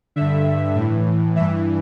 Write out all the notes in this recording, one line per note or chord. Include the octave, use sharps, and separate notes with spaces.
G2 D3 E5
A2 E3
G2 E3 E5